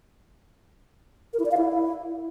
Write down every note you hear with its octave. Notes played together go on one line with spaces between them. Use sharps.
A#4
E4
D5
F5
E4